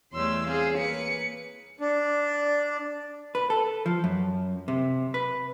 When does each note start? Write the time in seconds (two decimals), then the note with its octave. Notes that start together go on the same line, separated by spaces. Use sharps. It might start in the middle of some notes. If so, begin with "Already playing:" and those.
0.13 E2 G3 A3 C#5 C6 E6
0.48 C4 G#4 F5
0.77 A#3 B4 C#7
1.81 D4
3.35 B4
3.50 A4
3.86 F3
4.04 F#2
4.68 C3
5.14 B4